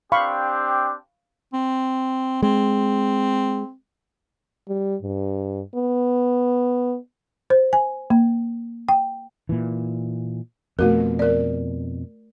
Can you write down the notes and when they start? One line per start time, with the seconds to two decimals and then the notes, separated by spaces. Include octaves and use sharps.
0.12 C4 D4 G4 F5 B5 C#6
1.53 C4
2.43 G#3 C4
4.68 G3
5.02 G2
5.76 B3
7.50 C5
7.73 G#5
8.10 A#3
8.89 G5
9.49 A#2 E3
10.79 F2 B2 A3 F#4 A#4
11.19 A#4 D5